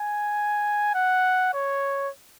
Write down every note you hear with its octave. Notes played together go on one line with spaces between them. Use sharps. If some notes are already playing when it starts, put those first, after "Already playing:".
Already playing: G#5
F#5
C#5